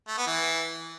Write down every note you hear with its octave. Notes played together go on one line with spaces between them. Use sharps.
A3
B3
E3